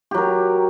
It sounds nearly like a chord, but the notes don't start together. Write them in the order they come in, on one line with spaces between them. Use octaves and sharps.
G4 F#3 A#4